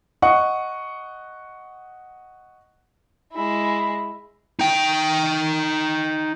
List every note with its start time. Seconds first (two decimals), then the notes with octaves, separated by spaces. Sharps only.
0.22 D#5 F#5 C#6
3.32 G#3 E4
4.59 D#4 G5